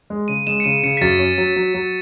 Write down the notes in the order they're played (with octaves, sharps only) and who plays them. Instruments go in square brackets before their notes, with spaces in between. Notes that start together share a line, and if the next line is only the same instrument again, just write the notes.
[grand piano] G#3
[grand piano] C#3 [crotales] D#7
[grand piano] G#3 [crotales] E7
[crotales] C#7
[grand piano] C#3 [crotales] D#7
[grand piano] C#3 [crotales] C#7
[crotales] B6
[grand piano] F#2 [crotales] A6
[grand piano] C#4
F#3
F#3
F#3